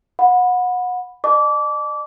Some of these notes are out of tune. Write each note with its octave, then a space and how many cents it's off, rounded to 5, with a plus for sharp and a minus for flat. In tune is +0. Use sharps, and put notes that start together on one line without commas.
F#5 -30 B5 +0
D#5 -45 A5 -30 D6 -25